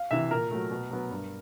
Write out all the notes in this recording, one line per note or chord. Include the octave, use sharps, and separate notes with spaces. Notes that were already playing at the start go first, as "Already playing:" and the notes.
Already playing: F5
C3 E3 E5
A#2 A#4
F#3 A3
B2
F#3 B3
G2